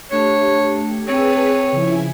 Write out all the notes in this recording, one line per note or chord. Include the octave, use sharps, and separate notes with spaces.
A3 D4 G4 C#5
C4 G#4 B4 C#5 A5 D#7
C#3 F3 E4 G#5